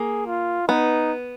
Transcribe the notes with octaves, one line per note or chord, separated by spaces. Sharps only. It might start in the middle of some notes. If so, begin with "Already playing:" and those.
Already playing: A#3 G#4
F4
B3 D#4